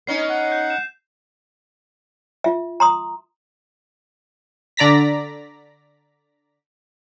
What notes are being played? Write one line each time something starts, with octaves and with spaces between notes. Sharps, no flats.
B3 C#4 D#4 C7
F#5
G6
G6 E7
F4 E5
A#5 C6 D#6
D3 D5 A#5 A#6 B6